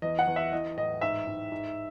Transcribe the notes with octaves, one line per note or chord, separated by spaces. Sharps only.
E2 D#5
F#5
E2
E5
E3 D#5
A2 D#5
G#2 E5
G#2
G#2